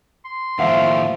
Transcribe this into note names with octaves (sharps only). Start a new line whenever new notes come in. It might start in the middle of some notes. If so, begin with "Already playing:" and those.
C6
D#2 A2 F3 E5 F5